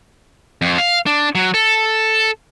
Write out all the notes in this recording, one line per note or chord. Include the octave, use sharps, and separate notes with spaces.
F2
F5
D4
F#3
A4